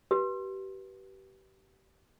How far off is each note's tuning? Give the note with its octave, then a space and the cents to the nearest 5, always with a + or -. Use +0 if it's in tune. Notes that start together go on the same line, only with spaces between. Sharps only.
G4 -30 B4 -20